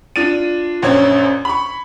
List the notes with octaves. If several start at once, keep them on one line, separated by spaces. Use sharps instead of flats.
D4 F4 A6 D#7
A#1 F#2 C5 C#5 G#6
B5 C#6